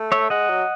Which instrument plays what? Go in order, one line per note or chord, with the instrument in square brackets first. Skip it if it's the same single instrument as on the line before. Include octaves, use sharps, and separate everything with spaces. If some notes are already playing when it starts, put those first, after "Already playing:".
Already playing: [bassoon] A3
[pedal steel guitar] C#5 E5
[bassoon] G#3 [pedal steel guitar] D#5 F#5
[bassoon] F#3